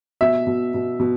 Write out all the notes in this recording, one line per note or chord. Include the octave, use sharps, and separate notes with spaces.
B2 E5
B2
B2
B2